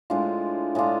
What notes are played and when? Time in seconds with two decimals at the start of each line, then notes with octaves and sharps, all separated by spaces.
0.10 A2 G#3 D4 F4
0.75 A2 G#3 D4 F4